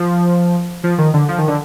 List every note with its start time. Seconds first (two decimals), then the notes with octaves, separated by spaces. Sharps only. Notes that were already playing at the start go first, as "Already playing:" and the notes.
Already playing: F3
0.84 F3
0.98 D#3
1.14 D3
1.29 F3
1.38 D#3
1.48 D3